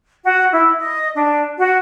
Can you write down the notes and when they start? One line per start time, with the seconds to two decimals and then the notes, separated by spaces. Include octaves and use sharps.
0.25 F#4
0.51 E4
0.79 D#5
1.15 D4
1.59 F#4